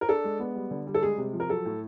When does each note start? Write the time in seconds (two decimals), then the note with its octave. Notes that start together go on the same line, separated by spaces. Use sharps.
0.01 A#4
0.09 D4 A4
0.24 G#3
0.39 B3
0.55 G3
0.71 D3
0.87 G3
0.94 A4
1.03 G#3 G#4
1.18 C3
1.33 F3
1.40 A#4
1.49 F#3 A4
1.65 A2